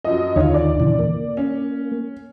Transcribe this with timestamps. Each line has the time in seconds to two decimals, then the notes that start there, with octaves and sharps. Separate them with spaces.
0.05 F#2 F3 D#5
0.36 D#2 D3 D#3 F4 C#5
0.54 D5
0.80 A#2 C#3 E3
0.99 A#3
1.37 C#4